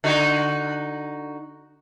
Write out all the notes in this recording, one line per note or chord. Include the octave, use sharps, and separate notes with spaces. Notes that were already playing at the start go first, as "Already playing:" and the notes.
D3 D#4 F#4